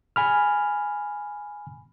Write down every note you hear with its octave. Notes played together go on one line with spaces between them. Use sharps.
G#5 B5 F6